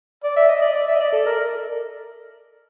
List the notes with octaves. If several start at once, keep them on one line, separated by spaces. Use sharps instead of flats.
D5
E5
D#5
D5
D5
E5
D#5
D5
A4
A#4